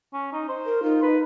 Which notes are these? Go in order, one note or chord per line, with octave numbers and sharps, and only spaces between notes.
C#4
D#4
C5
A#4
D#4 F4
B4